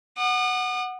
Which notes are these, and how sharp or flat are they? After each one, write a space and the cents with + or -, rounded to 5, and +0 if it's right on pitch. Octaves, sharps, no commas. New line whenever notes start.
F#5 +0 D#6 -45